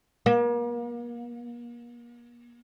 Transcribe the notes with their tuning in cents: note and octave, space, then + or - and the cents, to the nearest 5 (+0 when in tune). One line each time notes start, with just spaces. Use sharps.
A#3 +40